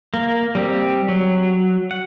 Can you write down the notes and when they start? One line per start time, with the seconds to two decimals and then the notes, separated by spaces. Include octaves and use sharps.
0.14 A#3
0.55 G3 C4 G4
1.08 F#3
1.91 F#5